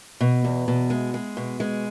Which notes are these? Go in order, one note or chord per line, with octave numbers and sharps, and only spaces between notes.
B2
E2
B2
G#3
G#3
B2
G#3